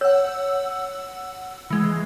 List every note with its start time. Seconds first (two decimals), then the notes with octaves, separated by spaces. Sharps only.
0.01 C#5 F#5 E6
1.70 E3 G#3